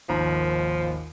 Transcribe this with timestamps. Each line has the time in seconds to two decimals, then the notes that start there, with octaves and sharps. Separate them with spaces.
0.09 G#1 D#2 F3 A#5